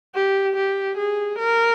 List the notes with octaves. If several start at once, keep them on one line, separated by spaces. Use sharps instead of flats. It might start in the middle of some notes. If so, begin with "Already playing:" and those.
G4
G4
G#4
A#4